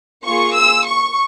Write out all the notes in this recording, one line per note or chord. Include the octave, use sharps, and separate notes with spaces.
A#3 F4 G#4 C#6
E6
C#6